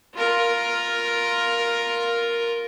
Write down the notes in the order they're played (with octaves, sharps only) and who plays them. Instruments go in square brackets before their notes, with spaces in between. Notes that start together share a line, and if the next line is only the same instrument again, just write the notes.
[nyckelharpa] F4 A#4